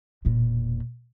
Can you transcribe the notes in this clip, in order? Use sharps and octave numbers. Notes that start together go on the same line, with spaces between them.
E1 A#2